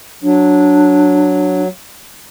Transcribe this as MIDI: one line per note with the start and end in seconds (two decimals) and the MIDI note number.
0.23 1.68 54
0.23 1.62 62